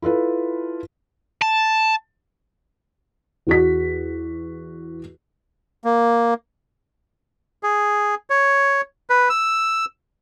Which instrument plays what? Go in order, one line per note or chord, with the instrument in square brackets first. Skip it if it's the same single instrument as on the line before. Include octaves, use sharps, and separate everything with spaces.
[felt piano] E4 F4 A4 B4
[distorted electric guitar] A5
[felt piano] E2 F#4 B6
[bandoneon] A#3
[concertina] G#4
C#5
B4
E6